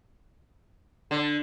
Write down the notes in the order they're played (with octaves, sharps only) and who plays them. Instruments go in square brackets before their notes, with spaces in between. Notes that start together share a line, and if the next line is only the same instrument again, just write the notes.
[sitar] D3